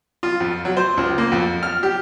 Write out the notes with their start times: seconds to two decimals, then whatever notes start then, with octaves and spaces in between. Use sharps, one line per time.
0.23 F4
0.41 F2
0.65 F#3
0.77 C5
0.97 C#2
1.18 A#3
1.32 F2
1.63 F6
1.83 G4